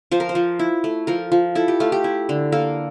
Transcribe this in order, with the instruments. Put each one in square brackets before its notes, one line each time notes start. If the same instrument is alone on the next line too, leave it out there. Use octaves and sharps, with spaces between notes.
[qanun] F3 C5
A#4
C5
F3
E4
A3
F3 A#4
F3
E4 A4
G4
A3 F4
G4
E4
D3
A#3 A4